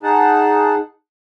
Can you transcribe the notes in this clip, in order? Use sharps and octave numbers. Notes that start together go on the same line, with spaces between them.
D#4 G#4 F#5 A5